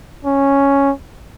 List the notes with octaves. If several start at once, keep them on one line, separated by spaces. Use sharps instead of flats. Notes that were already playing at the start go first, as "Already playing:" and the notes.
C#4